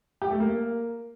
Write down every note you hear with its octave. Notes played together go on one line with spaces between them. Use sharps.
G4
A3
A#3